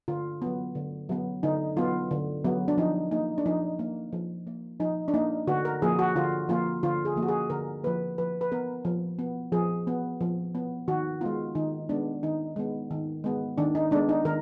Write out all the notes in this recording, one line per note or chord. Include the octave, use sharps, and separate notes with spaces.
D3 F4
F#3 B3
D3
F#3 B3
D3 D#4
F#3 B3 F4
D3
F#3 B3
D4
F3 D#4
A#3 D#4
D4
F3 D#4
A#3
F3
A#3
F3 D#4
D4
A#3 D#4
D3 F#4
A#4
F3 A#3 G#4
F#4
D3 F4
F3 A#3 F4
D3 F4
G#4
F3 A#3
F#4
G#4
D3 A#4
F3 A#3 B4
F3 B4
B4
B3 A#4
F3
B3
F3 G#4
B3
F3
B3
D#3 F#4
G#3 B3 F4
D#3 D#4
G#3 B3 D4
D#3 D#4
G#3 B3
D#3
G#3 B3
D#3 D4
D#4
G#3 B3 D4
D#4
D#3 A#4